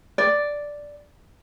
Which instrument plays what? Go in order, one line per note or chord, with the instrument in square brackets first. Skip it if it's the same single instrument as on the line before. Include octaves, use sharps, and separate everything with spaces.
[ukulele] D5